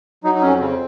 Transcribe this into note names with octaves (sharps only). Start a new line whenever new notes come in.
F#3 D#4
D#4
F2 C#4
C#3 C4